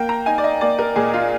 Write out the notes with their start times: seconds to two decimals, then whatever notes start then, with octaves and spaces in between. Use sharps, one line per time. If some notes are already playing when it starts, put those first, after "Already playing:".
Already playing: A#3 G5
0.09 A#5
0.26 D#4 G#5
0.38 D5
0.44 D#5
0.61 A#3 D5
0.79 A#4
0.96 A#2 G#4
1.13 F4